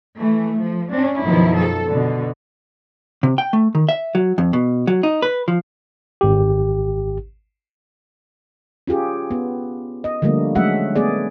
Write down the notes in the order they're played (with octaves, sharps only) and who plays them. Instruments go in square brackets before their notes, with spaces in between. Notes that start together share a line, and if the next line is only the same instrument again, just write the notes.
[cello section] E3 A3
F3
C#4 D4
F#2 B2 D#3 F3 E4
A4
B2 D3
[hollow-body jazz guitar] C3
G5
A3
D#3
E5
F#3
F2
B2
F#3
D#4
B4
F3
[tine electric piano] G#1 G4
[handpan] C#4 F4 G4 G#4
B3
D#5
D3 F3 G3 A3 A#3
F#3 G#3 A3 C#4 E5 F#5
A3 B3 G#4 D5